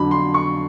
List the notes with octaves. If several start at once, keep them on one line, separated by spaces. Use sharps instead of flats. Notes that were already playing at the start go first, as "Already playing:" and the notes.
Already playing: F2 D3 F#3 B5
C6
C#6